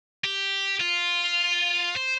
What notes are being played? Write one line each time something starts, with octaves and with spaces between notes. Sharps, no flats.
G4
F4
C5